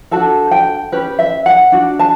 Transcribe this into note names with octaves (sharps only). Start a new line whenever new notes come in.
D4 F#4 A4 A5
G5
C#4 G4 B4
E5
F#5
D4 F#4
A5